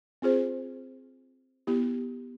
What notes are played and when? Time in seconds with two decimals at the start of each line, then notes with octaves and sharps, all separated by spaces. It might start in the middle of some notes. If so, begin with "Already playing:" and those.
0.22 C4 F4 G#4 C5
1.67 B3 E4 G4